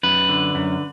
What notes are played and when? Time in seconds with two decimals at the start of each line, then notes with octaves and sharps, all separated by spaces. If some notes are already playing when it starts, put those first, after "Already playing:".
0.03 F#2 B4
0.29 D3
0.55 F#2